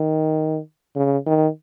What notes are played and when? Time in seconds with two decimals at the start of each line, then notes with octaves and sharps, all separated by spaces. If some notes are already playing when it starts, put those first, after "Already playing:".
Already playing: D#3
0.96 C#3
1.26 D#3